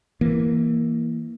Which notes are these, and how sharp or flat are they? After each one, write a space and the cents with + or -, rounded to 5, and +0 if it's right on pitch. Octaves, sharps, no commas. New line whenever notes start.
E3 +0 A#3 +0